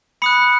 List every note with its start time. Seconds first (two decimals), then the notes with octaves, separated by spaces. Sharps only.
0.22 B5 D#6 F#6 C#7